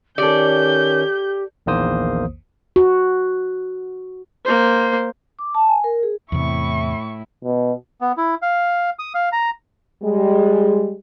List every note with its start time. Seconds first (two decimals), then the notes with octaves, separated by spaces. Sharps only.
0.18 D#3 C#4 G4 A4 D5 G6
1.66 A#1 E2 D#3 A#3 C5 D#6
2.76 F#4
4.45 A#3 C5
5.39 D6
5.55 A5
5.68 G#5
5.84 A#4
6.03 G#4
6.32 E2 A2 C3 E4 C#6
7.44 B2
8.01 B3
8.17 E4
8.42 F5
8.99 D#6
9.14 F5
9.32 A#5
10.02 G3 G#3